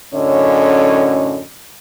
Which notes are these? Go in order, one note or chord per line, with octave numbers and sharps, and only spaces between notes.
F#2 A2 D3 C#4 C#5 D#5